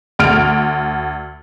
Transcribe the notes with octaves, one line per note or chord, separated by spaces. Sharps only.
D2 F6 D7